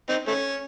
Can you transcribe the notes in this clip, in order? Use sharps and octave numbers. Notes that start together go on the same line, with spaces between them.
C4 D#4
A3 C#4